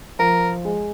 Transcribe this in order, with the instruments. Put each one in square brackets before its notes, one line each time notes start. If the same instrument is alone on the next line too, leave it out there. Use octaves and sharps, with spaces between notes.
[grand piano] F3 [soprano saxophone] A#4
[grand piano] G#3